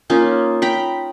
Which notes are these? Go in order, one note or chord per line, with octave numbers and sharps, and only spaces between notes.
A#3 C#4 D#4 F4
G5 A#5 B5